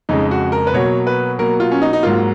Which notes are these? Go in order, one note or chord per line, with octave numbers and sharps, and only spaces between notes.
F2 C#3 G#3 D#4
F#4
A#4
B4
B2 F#3 A#3 C#5
B4
B2 F#3 A#3 A#4
F4
C#4
D#4
D#4
G#2 F#3 A#3 F4